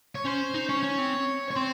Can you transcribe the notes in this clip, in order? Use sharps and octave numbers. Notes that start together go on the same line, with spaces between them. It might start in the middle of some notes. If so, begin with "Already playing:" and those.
C#5
C#4 C5
D#4
C#4 C#5
C#4
C4
C#5
C4 C5